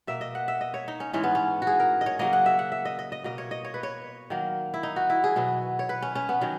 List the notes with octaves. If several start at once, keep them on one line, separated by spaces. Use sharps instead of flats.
B2 A#3 E5
D#5
F#5
E5
D#5
C#5
D#4
C#4
G#2 E3 G#3 C#4
B3
C#4
F#4
G#4
A#4
D#5
C#5
C#3 F#3 A#3 D#5
F#5
E5
F#5
E5
D#5
D#5
D#5
B2 A#3 D#5
C#5
D#5
C#5
B4
C#5
D#3 F#3 A#3
E4
D#4
F#4
E4
G#4
B2 F#3 B3
C#5
B4
C#4
C#4
B3
D#3 F#3 C#4